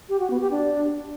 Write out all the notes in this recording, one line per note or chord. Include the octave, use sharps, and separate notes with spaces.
G4
F#4
B3
G4
D4